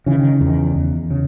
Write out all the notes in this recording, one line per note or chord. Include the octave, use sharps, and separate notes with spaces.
C#3 E3
D#3
E2
D#3
E2
C#3